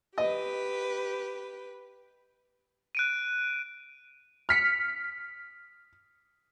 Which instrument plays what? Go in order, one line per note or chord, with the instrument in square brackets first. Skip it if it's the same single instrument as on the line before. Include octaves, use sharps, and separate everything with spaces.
[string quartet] G4 B4 [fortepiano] D#5
[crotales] F#6 D7 D#7
[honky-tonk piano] F6 B6 C#7